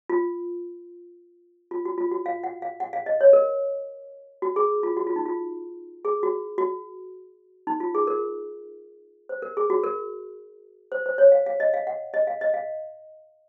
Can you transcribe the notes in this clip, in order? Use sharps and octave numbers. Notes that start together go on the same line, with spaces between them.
F4
F4
F#4
F4
F#4
F5
F#5
F5
F#5
F5
D#5
C#5
A#4
F#4
G#4
F4
F#4
F4
D#4
F4
G#4
F#4
F#4
D#4
F4
G#4
A#4
C5
A#4
G#4
F#4
A#4
C5
C5
C#5
F5
F5
D#5
F5
F#5
D#5
F5
D#5
F5